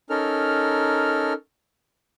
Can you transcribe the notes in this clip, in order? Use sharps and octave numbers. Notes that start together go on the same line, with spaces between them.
C#4 D#4 A4 A#4 F6